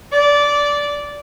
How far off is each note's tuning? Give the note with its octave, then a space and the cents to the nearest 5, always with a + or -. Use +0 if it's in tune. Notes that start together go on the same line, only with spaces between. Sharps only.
D5 -15